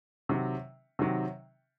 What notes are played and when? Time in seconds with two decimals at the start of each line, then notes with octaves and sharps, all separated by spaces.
0.29 C3 D#3 F#3
0.99 C3 D#3 F#3